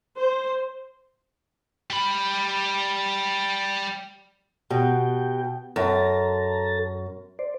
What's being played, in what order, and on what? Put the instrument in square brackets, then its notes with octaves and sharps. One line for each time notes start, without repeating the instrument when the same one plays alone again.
[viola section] C5
[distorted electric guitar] G3 B5
[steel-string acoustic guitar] B2 [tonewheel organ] F#4 G4 G5
[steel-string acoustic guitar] F#2 [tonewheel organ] A4 A5 A#5
[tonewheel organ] C5 D5